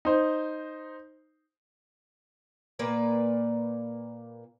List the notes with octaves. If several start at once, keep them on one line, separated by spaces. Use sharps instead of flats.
D#4 C5
A#2 A#3 B4 D5